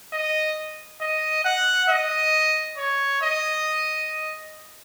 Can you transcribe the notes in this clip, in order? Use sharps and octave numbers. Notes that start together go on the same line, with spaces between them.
D#5
D#5
F#5
D#5
C#5
D#5